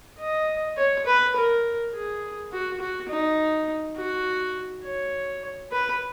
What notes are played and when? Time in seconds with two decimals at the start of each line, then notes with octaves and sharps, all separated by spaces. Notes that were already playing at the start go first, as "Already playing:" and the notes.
0.19 D#5
0.77 C#5
1.06 B4
1.36 A#4
1.93 G#4
2.52 F#4
2.80 F#4
3.09 D#4
3.96 F#4
4.84 C#5
5.71 B4